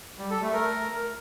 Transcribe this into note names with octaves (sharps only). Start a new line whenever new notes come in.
G3
A4
A3
A#4